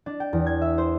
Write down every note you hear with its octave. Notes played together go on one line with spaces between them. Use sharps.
D4
G5
E2
G#6
E5
C5